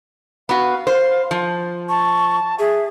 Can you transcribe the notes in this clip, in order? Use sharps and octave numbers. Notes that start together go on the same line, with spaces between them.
B3 F#4 F5
C5
F3
A5 C#6
G#4 E5